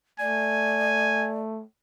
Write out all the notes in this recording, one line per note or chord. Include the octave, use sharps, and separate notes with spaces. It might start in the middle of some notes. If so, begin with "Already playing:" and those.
A3 D5 G#5